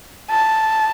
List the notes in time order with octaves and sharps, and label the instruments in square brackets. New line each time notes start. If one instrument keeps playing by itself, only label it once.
[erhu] A5